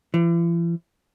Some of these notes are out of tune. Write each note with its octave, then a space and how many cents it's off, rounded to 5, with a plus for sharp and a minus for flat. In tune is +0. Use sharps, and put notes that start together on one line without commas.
E3 +45